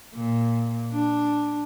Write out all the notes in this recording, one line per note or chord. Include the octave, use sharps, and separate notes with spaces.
A#2
D4